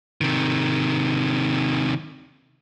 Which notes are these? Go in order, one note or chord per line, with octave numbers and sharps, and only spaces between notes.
C3 D#3